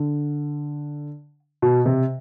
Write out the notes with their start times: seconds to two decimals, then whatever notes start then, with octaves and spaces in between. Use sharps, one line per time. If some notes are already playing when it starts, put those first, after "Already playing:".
Already playing: D3
1.62 B2
1.86 C3